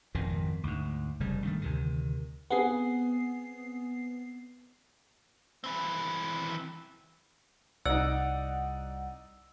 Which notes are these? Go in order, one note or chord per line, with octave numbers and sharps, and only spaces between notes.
G#1 F2 B2 D#3
D2 G#2
F1 C#3 G3
G2 D#3 G#3 A3
D2 C3 D#3
B3 C4 G#4 F#5 C7
E3 C4
C2 D#4 D5 F#5 E6